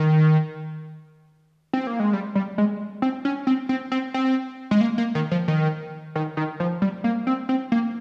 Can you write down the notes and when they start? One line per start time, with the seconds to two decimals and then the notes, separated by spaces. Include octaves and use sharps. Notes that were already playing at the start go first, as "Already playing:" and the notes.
Already playing: D#3
1.73 C4
1.87 A#3
2.00 G#3
2.13 G3
2.35 G3
2.58 G#3
3.02 C4
3.25 C#4
3.47 C4
3.69 C4
3.92 C4
4.14 C4
4.71 G#3
4.81 A#3
4.98 A#3
5.15 D#3
5.31 F3
5.48 D#3
6.15 D#3
6.37 D#3
6.60 F3
6.82 G3
7.04 A#3
7.27 C4
7.49 C4
7.72 A#3